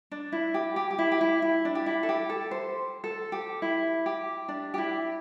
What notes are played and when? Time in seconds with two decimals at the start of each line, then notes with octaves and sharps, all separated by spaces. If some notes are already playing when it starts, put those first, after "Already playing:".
0.12 D4
0.32 E4
0.54 G4
0.76 G4
0.91 G4
0.99 E4
1.12 G4
1.21 E4
1.42 E4
1.65 D4
1.75 G4
1.86 E4
2.03 A4
2.09 G4
2.30 A4
2.51 C5
3.04 A4
3.32 G4
3.62 E4
4.06 G4
4.48 D4
4.74 G4
4.78 E4